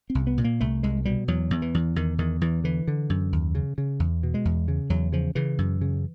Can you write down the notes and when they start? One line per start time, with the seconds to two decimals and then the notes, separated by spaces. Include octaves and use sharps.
0.10 C4
0.15 C2
0.27 B3
0.38 A#2
0.44 A#3
0.60 C2 A3
0.83 C2 G#3
1.05 B2 G3
1.28 E2 F#3
1.51 E2
1.62 E3
1.74 E2
1.96 E2 D#3
2.18 E2 D#3
2.41 E2 E3
2.64 D3 E3
2.88 D3
3.10 F#2
3.33 D#2
3.55 C#3
3.78 C#3
4.00 E2
4.23 B2
4.34 G#3
4.45 E2
4.68 C#3
4.90 E2 F#3
5.13 C#3 F3
5.35 C#3 E3
5.58 F#2
5.81 C#3